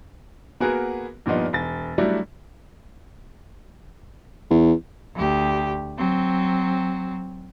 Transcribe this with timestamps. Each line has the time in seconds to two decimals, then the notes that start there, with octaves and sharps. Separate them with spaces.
0.60 A#3 B3 F#4 G#4 A#4 B4
1.26 G2 A#2 F3 B3 D#4
1.53 E1 A6
1.98 F#3 G3 A3 D4 E4 F#4
4.50 E2
5.15 D2 G4
5.98 F#3 C4